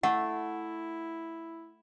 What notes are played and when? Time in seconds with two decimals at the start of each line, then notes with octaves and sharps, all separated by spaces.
0.03 A3 E4 F#5